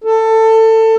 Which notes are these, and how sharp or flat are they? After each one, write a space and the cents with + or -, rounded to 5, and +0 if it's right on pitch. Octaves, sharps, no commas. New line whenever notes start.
A4 +20